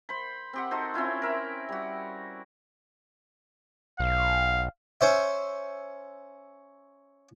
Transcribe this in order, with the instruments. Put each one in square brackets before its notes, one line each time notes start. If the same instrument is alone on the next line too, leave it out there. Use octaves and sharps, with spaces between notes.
[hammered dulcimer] C5 B5
C4 G4 F#5
D#4 F#4 A4 C5
C4 C#4 E4 F4
A#4 E5
G3 F#4
[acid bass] B1 [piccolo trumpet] F5
[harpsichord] C#4 C5 E5